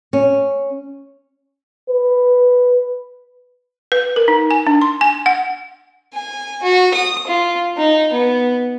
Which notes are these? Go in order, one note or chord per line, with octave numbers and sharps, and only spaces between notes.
C#4
B4
B4
A#4
D#4
G#5
D4
C6
G#5
F#5
G#5
F#4
D#6
F4
D#4
B3